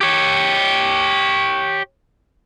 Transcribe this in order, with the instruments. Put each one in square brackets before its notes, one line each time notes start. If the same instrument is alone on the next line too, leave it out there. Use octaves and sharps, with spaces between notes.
[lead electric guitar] G4 C#5